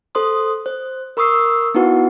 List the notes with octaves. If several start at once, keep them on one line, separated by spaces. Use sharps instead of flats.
A4 C5 C6 D#6
C5
A#4 B5 C#6 D#6 E6 C7
B3 D#4 E4 F#4 B4 F#5